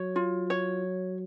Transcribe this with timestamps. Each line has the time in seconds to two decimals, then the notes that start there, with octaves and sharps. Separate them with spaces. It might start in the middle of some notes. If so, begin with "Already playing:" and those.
Already playing: F#3 C#5
0.16 F4
0.50 C#5